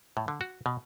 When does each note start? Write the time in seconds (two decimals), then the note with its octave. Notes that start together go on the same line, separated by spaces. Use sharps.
0.17 A2
0.28 D3
0.41 F#4
0.66 B2